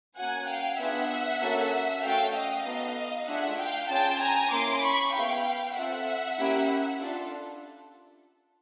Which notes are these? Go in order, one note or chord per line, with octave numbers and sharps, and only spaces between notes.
A#3 C#4 F#4 F#5 G#5
F5 G5
B3 D4 F4 G#4 E5 F#5
A#3 C#4 F#4 A4
A3 C#4 F#4 A4 F5 G5
D#5 F5
B3 D#4 F#4 A4
A3 D4 F4 G#4 E5 F#5
F5 G5
C#4 F4 G#4 G5 A5
G#5 A#5
A#3 C#4 E4 C6 D6
B5 C#6
B3 E4 G#4 F5 G5
C4 F4 A4 E5 F#5
A#3 C#4 E4 G4
D4 F4 A4